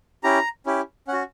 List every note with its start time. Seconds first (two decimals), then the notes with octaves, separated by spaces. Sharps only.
0.24 C#4 E4 G4 A#5
0.66 C#4 E4 G4
1.08 C#4 F#5
1.13 F#4